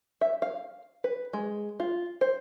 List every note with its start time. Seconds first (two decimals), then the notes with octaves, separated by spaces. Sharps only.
0.21 E5
0.42 F5
1.04 B4
1.33 G#3
1.80 F4
2.21 C5